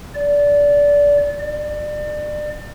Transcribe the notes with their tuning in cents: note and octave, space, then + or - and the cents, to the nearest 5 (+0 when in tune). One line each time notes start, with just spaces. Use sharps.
D5 -20
D5 +30